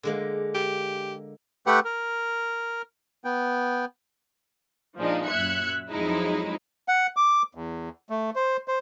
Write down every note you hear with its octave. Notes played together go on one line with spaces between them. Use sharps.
D3 G#3 A#3
G4
A3 G4 B4 F#5 G5
A#4
B3 G5
A#2 F3 G#3 D4 D#4
F#2 A#2 E5 F#6 G#6 C#7
F2 F3 F#3 G#3 D#4 E4
F#5
D6
E2
A3
C5
C5